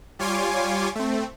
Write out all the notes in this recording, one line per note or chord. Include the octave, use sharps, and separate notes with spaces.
G3 F4 C#5 G#5 C6 D6
A3 C4